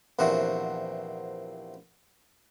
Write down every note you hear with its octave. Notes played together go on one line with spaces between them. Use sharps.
A#1 E2 C3 F#4